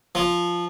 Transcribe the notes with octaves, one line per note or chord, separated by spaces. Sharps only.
F3